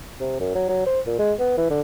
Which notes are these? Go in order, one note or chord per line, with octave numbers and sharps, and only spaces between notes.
C3
F#2
F#3
F#3
C5
A#2
G#3
B3
E3
D3